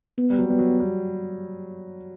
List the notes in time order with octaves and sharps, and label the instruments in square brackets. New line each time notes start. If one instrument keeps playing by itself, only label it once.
[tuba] B3
[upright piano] G3
F#3
[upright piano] G3 [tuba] B3
[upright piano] F#3
G3